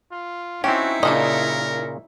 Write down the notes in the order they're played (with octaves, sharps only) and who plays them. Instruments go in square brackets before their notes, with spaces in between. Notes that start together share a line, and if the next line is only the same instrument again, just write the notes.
[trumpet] F4
[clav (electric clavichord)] C4 C#4 [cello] D#4 E4 [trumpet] F#4 [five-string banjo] G4
[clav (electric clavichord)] A#2 C#3 [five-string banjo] D4 A4 D#5 [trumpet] A#4